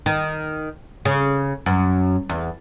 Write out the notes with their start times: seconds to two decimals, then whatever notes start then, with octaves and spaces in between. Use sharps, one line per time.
0.06 D#3
1.05 C#3
1.66 F#2
2.29 E2